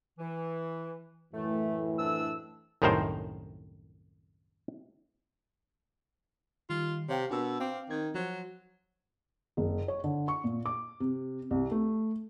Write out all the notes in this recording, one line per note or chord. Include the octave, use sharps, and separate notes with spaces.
E3
F#2 A2 E3 A3
F2 D4 E6
C2 F#2 A2 D#3 A#4 C5
D#3 G3 F4
C3 C#5 F5 G5
B2 D4 A#4 E6
C4 F5 D6
D#3 C4 G#6
F3 F#3 C5
F#1
C#5
D3
C#6
A#2
D6
C3
C2
A3